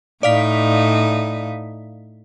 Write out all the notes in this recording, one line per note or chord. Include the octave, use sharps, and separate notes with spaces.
A2 D#4 D5 F5 B6